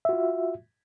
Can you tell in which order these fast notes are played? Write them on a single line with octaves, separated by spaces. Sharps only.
E5 F#4 F4